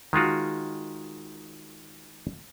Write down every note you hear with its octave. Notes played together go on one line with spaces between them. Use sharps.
D#3 G#3 F4 F#4